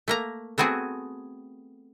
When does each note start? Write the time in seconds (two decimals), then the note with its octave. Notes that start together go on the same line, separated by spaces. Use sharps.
0.08 A3 A#3 A#5
0.58 A3 B3 C4 F#4 G#4